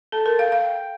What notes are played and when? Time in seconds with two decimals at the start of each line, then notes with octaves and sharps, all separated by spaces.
0.12 A4 A5
0.26 A#4
0.39 F5 G5
0.52 F5